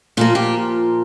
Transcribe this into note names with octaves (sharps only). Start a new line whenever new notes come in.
A#2 F3 A#3 F4
G4